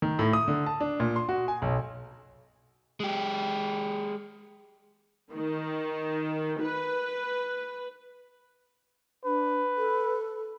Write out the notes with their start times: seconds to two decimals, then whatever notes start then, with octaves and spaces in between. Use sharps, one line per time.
0.02 D#3
0.19 A2
0.33 D#6
0.48 D3
0.66 A5
0.80 D4
1.00 A#2
1.16 C6
1.29 F#4
1.48 G#5
1.62 B1
3.00 G#3 G4
5.34 D#3
6.61 B4
9.25 D4 B4
9.77 A4